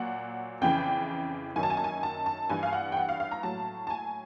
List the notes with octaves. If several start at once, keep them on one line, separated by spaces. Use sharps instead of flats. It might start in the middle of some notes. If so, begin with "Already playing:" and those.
Already playing: A#2 F#3 F#5
F2 C#3 E3 G5
F#2 D#3 F#3 G#5
A5
G#5
A5
G#5
A5
A5
G2 E3 G#5
F5
F#5
G5
F#5
F5
F5
A#5
A2 F#3 A5
A5
G#5